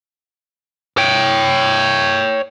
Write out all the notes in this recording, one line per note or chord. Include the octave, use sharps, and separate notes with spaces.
C#5 G5